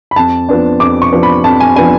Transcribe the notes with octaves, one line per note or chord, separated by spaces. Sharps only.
B5
F2 A5
F3 B3 D4
F2 D6
C#6
F3 B3 D4
B5
F2 A5
G#5
F3 B3 D4 G#5